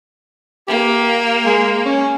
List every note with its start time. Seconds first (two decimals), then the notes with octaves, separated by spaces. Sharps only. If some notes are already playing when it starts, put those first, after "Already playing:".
0.68 A#3 G4
1.46 G#3
1.86 C#4